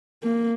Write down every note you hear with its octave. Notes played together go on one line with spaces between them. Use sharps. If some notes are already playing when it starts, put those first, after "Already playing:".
A#3